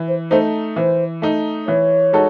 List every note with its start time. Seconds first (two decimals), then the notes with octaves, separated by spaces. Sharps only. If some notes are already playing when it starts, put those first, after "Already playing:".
Already playing: E3
0.08 C5
0.31 A3 D#4 C5
0.76 E3 C5
1.22 A3 D#4
1.67 E3 C#5
2.13 G#3 D#4 F#4 A4